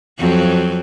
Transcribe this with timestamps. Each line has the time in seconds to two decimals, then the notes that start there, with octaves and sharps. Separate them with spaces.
0.19 F2 F3 F#3